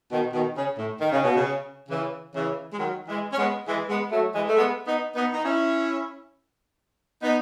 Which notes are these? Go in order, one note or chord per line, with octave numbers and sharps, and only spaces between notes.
B2 D#3
B2 D#3
C#3
A2
D#3
C#3
B2
C#3
C#3 E3
C#3 E3
G#3
D#3 F#3
E3 G#3
C#4
G#3 B3
E3 G#3
G#3 B3
F#3 A3
E3 G#3
A3
G#3 B3
B3 D#4
B3 D#4
D#4
C#4 E4
B3 D#4